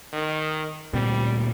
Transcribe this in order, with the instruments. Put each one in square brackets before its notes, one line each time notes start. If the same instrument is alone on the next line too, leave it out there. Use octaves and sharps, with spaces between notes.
[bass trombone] D#3
[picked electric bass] D2 A#2 C4 [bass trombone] G3